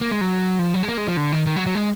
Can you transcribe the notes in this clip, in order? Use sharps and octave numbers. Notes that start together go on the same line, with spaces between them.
A#3
G#3
F#3
F3
F#3
G#3
A#3
G#3
F3
D3
D#3
D#3
F#3
F#3
G#3